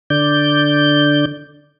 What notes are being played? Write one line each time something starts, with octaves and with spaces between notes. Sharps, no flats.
D3 D5 G6